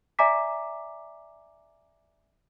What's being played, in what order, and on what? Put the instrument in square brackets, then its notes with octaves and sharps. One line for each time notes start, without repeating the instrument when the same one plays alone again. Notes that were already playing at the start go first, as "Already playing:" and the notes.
[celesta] D5 E5 G#5 A#5 D6 B6